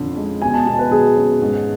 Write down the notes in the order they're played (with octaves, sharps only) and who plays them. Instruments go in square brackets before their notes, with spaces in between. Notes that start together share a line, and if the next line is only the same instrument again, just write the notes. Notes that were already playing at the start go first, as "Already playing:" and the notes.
Already playing: [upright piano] F2 D3 C#4
G#3
[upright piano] B2 [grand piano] G#5
[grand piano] A5
[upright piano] B2 [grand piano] A5
[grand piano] B4
[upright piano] F#3 [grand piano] G#4
[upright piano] C#4
G#2